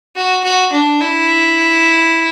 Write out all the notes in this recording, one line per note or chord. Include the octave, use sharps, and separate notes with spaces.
F#4
F#4
D4
E4